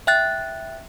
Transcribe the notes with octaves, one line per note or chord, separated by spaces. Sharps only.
E5 G5 F#6 A6